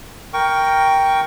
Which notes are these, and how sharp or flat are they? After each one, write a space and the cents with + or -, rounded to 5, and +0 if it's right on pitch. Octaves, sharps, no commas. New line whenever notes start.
A#4 +0 G5 +0 C#6 +10